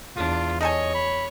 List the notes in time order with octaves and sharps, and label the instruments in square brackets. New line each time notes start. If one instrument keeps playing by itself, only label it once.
[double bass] E2 [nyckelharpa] D4 [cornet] F4
[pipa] D#4 A4 G#5 [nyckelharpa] C#5 [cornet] D#5
[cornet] B5